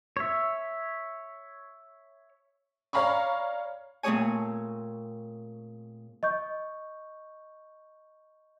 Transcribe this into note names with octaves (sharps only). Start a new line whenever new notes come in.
C#5 E5
C#5 D5 F5 A#5 B5 C#6
A#2 A3 C4 G#4 C#5 G#5
D#5 C#6 G6